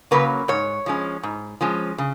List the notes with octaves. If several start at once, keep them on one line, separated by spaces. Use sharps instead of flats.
C#3 F#3 A#3 C#4 B4
G#2 C#5
F3 G#3 C#4
G#2
F3 G#3 C#4
C#3